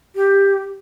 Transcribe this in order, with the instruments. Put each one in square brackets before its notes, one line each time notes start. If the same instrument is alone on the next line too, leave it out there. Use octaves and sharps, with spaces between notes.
[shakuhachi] G4